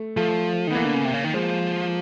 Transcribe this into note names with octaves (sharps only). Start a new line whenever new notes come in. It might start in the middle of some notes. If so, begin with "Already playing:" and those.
Already playing: A3
F3 A3
D#3
B3
E3 A#3
D3
C#3
C3
C#3
D#3
F3 G#3